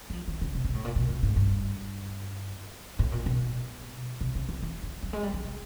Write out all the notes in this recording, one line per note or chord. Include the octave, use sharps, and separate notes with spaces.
F#3
F3
D#3
C#3
C3
B2
A2
A#2
B2
A2
G#2
G2
A2
A#2
B2
C3
C#3
D3
E3
F3
F#3
G#3
G3
F#3
C3